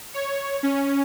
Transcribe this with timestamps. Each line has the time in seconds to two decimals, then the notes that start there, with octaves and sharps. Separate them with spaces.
0.14 C#5
0.63 C#4